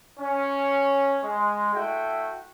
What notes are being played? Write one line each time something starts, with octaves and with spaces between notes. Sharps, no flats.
C#4
G#3
A3 E4 F#4 G5